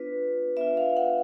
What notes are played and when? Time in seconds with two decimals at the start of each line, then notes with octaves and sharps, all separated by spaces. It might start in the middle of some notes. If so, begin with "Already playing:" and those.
Already playing: B3 D4 F4 B4
0.57 B3 D4 F4 E5
0.77 F5
0.97 F#5